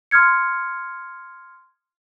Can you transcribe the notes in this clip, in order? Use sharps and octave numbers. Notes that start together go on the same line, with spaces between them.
C6 D#6 F6 G#6 C#7